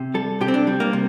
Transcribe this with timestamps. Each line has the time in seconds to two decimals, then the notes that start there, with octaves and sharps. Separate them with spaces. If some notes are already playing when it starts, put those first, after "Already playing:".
Already playing: C3
0.14 G3 A4
0.41 C3 G4
0.48 C4
0.54 D4
0.67 G3
0.80 A#3
0.93 C3